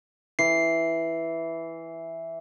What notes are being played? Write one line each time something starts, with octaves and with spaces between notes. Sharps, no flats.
E3 C7